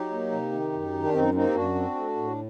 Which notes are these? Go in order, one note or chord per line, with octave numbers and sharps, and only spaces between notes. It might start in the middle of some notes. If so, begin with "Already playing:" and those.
Already playing: F#3 D#4 G4
A#3
C3
D#3
F#2
D#3
D4
F#2 C4 D#4
A#3 C4 D#4
G4
F#2 D4 F#4
C4
A3
A2